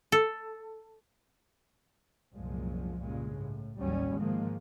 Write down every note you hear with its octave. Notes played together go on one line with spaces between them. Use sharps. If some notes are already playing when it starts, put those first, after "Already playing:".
A4
C2 F#2 A#2 F3 G#3
G2 A#2 C#3 G#3
A2
A1 D#2 F#3 G3 C#4
G#2 D#3 F3 G#3 A#3